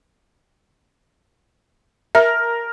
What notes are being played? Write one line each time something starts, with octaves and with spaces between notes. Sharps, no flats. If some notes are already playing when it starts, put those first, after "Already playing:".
A#4 E5